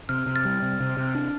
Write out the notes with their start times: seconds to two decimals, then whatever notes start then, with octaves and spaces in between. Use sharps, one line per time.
0.09 C3 F6
0.26 C3
0.36 F6 A6
0.45 G3
0.62 C3
0.80 C3
0.97 C3
1.15 D4